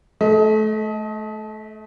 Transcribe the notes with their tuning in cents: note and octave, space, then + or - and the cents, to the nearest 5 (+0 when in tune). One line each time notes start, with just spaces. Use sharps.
A3 -25 D#5 +30